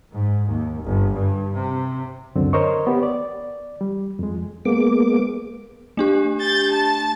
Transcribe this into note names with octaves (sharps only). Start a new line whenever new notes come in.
G#2
D#2
G1
G2
C3
C#2 F#2 D3 C4
A#4 C5 C#5 D#5 C#6
B3 G4
D5
G3
F2 G#3
G#3 A#3 B3 D6
A3 D4 G4
G6 A6
A5 A6